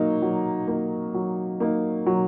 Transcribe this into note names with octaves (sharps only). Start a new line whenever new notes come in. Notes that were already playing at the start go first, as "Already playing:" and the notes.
Already playing: F#3 A#3 D#4
F#3
A#3 D#4
F#3
A#3 D#4
F#3